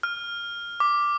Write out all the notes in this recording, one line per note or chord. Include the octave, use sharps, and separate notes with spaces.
F6
D6